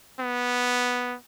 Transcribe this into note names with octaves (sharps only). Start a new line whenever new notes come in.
B3